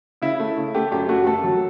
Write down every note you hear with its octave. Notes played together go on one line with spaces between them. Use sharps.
C#3 E4
A3
C#3
A3 G4
F#2 G4
A3 F#4
A3 A4
F#3